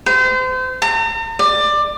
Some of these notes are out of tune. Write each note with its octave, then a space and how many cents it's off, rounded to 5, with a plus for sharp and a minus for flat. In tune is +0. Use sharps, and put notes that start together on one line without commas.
C5 -35
A#5 -45
D5 +20